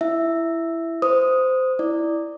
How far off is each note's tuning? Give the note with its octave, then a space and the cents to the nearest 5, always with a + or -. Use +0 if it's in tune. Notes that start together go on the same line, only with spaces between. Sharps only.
E4 +15 E5 +0
C5 -15 D#6 +0
E4 +0 D5 +0